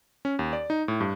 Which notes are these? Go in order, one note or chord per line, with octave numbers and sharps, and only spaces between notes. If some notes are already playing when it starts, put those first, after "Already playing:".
C#4
D#2
D5
D#4
A2
G2